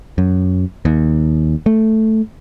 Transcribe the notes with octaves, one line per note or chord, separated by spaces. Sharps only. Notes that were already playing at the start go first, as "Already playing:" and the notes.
F#2
D#2
A3